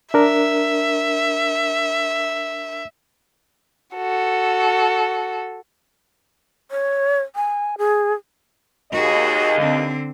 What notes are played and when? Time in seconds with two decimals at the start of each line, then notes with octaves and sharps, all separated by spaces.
0.14 D4 A#4 E5
3.95 F#4 A4
6.71 C#5
7.35 G#5
7.78 G#4
8.92 D#2 F#4 G#4 D#5
9.59 D3 C4